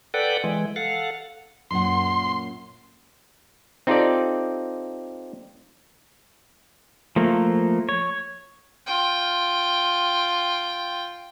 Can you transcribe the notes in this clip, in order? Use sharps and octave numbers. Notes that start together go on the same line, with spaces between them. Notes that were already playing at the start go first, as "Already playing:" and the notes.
A4 B4 D5 F#5 G5
E3 G#3
A4 F5 F#5
F#2 A#2 F#5 C6
C4 D#4 F4 G4 A4 D5
F3 A3 A#3
C#5
F4 G5